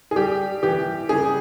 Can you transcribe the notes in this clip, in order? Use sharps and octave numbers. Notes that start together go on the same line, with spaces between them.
G#4
G3 G4
E3 G4
C#3 G#4